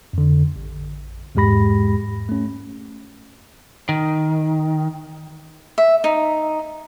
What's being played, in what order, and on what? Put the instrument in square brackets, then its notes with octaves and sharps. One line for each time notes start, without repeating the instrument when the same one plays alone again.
[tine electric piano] F2 D3
A1
E2 G#2 G#3 G4 B5 A#6
A3 C#4
[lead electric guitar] D#3
[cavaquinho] E5
D#4